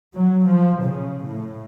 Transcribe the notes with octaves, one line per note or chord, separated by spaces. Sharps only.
F#3
F3
C#3
A2